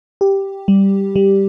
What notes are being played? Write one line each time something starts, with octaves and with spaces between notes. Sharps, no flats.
G4
G3
G3